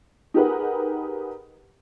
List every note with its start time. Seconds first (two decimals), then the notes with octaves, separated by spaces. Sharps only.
0.34 D#4 G4 G#4 A#4 B4 F#5